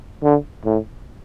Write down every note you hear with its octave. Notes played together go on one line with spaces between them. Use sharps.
D3
A2